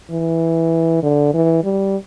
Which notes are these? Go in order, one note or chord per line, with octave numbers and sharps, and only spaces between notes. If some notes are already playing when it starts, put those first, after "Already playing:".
E3
D3
E3
G3